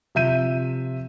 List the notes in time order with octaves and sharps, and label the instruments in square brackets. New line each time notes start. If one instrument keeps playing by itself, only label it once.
[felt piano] C3 F3 E5 G6 D#7